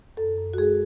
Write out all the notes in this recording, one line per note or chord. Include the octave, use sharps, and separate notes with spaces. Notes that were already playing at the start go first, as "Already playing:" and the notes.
F#2 A4
F#2
F#4
G#3 G#4